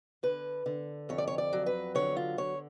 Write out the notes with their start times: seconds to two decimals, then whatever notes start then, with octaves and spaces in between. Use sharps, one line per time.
0.23 D3 B4
0.66 D3
1.09 F2 C#5
1.18 D5
1.27 C#5
1.38 D5
1.53 F#3
1.66 B4
1.95 D3 C#5
2.17 F4
2.38 D3 C#5